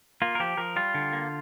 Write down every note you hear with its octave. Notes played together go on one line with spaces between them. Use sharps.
A#3 F4
A#4
F3 G4
F3 A#4
G3 F4
D3
A#3